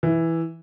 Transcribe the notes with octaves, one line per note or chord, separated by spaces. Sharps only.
E3